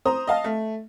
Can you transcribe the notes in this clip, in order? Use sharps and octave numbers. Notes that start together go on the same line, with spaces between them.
C5 A#5 D#6
D#5 F5 A5
A3